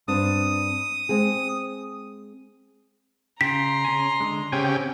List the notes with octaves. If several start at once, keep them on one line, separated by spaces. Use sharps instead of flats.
G2 C4 D4 D#6
G#3 C4 G#4
C#3 G5 A#5 C6 B6
C#3 G#5
D3 G#3
C#3 C4 G4 F#5 G#5